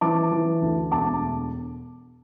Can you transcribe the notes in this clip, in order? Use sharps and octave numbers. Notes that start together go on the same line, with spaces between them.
E3 A5 D6
E3
D2
E1 A5 D6